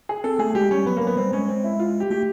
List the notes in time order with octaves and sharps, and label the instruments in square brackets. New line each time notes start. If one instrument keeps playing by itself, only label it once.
[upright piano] G#4
[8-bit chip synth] C4 [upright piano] A4
[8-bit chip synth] A3 [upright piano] G#4
[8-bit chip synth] G#3 [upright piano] G4
[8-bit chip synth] G3 [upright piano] C#4
[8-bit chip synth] F#3 [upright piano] B3
[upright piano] A#3
[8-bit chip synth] F#3 [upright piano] B3
[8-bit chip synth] G3 [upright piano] C4
[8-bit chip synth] G#3 [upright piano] C#4
[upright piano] C4
E4
F4
G4
[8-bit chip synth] A3 [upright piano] G4